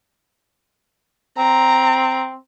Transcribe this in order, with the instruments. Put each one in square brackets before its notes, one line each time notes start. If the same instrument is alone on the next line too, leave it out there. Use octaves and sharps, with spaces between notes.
[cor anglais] C4 [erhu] A#5